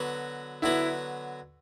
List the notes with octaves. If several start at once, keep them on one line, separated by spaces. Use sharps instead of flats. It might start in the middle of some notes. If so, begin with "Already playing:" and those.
Already playing: D3 F#3 B3 F#4
D3 F#3 B3 E4 F#4